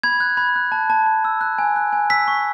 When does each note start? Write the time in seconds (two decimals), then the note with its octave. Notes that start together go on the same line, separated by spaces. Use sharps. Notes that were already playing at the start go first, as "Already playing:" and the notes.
0.03 B5 G#6
0.20 F#6
0.37 B5
0.56 F#6
0.72 A5
0.90 A5
1.06 A5
1.25 E6
1.41 F#6
1.58 G#5
1.76 F#6
1.93 G#5
2.10 E6 B6
2.28 C#6